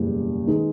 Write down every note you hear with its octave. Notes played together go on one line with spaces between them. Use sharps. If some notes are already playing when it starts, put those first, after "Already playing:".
Already playing: F#1 E2 B2 G3
D#3 G#3 B3 D#4